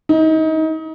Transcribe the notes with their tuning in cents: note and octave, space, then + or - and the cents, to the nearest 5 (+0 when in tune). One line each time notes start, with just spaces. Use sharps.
D#4 +30